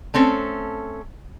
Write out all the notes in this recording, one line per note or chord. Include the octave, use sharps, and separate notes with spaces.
A3 C4 C#4 A4